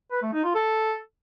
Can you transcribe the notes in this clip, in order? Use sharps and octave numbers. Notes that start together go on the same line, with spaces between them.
B4
A3
D#4
F4
A4